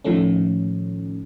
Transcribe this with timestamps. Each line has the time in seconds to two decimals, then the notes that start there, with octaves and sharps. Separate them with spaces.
0.04 A2 D#3 F3 A3 C#4